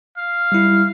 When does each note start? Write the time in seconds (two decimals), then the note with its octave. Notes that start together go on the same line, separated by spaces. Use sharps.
0.17 F5
0.52 G3 E4